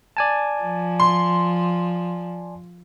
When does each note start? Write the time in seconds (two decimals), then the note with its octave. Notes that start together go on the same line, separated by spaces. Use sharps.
0.17 D5 G#5 A5
0.62 F3
1.00 C6